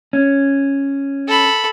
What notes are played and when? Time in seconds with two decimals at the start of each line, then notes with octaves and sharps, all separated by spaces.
0.13 C#4
1.27 A4 B5